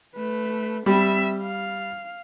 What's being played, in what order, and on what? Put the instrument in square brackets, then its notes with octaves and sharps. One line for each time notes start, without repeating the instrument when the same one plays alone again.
[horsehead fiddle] A3 B4
[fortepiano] G3 B5 [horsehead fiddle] C4 E5
[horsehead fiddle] F5